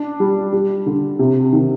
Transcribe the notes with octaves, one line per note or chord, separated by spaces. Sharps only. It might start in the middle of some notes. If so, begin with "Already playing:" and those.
Already playing: D4
G3
G3
D3
C3
D#3